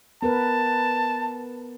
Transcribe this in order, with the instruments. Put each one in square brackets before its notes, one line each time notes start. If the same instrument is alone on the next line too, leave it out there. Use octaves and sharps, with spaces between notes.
[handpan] B3 A#4 B4 [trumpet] A5